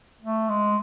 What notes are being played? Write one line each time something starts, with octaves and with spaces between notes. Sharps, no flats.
A3
G#3